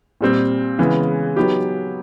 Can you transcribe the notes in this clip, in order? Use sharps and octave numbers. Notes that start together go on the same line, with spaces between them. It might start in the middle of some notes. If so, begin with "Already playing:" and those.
A#2 G3 C4
C#3 E3 G#3 B3
F#3 B3 D#4 G4